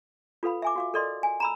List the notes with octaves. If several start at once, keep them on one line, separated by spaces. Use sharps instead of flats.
F4 A4 B4 F5 B5
E5 G#5 D6
F#4 F5 D6
A4 A#4 D5 D#5 C6
G#5
A#5 B5 E6